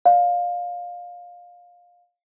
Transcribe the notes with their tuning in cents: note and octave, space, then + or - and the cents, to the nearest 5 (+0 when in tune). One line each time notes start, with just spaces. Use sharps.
D5 +0 F5 +15